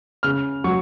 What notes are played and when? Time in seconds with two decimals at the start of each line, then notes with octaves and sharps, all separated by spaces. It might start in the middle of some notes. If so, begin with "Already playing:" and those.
0.23 C#3 F6
0.64 F#3 C#6